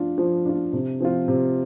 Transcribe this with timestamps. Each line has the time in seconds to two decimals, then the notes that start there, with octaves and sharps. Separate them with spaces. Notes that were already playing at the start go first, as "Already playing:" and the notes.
Already playing: F3 D4 F4
0.18 F3
0.46 D4 F4
0.73 C3
1.01 F3 C4 F4
1.28 C3